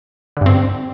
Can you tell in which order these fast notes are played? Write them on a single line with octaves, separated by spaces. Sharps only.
D3 G2 C4